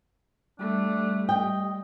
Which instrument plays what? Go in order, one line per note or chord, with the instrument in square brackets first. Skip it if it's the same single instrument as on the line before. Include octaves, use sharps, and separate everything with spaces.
[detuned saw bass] G3 [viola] A3 [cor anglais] D4
[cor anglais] D#5 [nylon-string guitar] G5